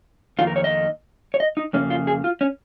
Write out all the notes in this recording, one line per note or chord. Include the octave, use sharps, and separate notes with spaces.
F2 D#3 A#3 F4
A#4
C#5
D#5
C#5
D#5
D#4
F2 C#3 A#3 C#4
F4
G#4
F4
C#4